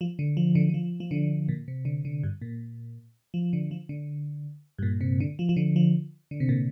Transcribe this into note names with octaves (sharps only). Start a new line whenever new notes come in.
F3
D3
F3
D3
D3
F3
F3
D3
A#2
C3
D3
D3
G2
A#2
F3
D3
F3
D3
G2
A#2
C3
D3
F3
F3
D3
F3
D3
C3
A#2